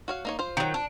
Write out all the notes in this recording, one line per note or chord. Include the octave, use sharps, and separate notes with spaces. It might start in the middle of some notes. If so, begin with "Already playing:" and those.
F#4 C#5 F5
A#3 D#4 C#5
F4 C5
D#3 F#3
D4